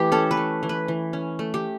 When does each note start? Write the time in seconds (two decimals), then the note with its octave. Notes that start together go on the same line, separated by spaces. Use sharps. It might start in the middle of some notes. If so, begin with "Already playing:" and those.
Already playing: E3 A3 G4
0.12 C#4 A4
0.31 B4
0.37 A3
0.63 E3
0.69 B4
0.88 E3
1.13 C#4
1.39 A3
1.54 G4